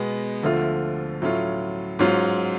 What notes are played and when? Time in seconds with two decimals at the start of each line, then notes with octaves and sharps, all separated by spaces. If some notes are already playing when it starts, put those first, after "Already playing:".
Already playing: B2 G#3 B3
0.43 D2 D3 F3 A3 F4
1.22 A2 F#3 A3 C#4 F4
1.99 G#2 F#3 C#4 F4